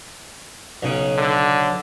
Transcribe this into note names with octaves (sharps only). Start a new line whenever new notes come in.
B1 C#3
D3